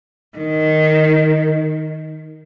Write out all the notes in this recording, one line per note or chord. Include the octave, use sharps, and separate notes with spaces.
D#3